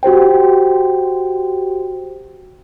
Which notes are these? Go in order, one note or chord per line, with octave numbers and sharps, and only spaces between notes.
F#4 G4 C5 G5